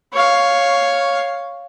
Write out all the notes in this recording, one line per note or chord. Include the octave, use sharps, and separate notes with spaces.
C#5 F5